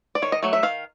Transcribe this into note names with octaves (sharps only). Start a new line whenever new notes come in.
D5
D#3 C#5
D#5
F#3 A3
E5
D#3 F5